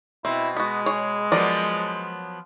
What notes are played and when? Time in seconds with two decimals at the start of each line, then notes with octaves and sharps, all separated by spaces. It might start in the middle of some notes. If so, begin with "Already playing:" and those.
0.25 B2 C4 E4
0.57 G#3 B3 F#4
0.86 G#4 C#5
1.32 F3 F#3 B3 A#4 D5